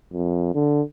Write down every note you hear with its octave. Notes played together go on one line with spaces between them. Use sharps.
F2
D3